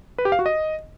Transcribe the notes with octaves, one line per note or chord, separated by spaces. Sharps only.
B4
G4
F5
F#4
D#5